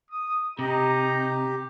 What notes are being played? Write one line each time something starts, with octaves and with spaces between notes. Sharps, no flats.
D#6
C3 D#4 G4 D#5 A#5